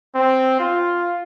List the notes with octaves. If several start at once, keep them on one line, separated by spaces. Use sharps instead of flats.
C4
F4